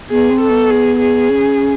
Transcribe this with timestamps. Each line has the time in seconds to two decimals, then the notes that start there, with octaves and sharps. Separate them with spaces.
0.10 B3 G#4
0.30 C4
0.40 A4
0.50 B3
0.70 G#4
1.00 G#4
1.30 C#4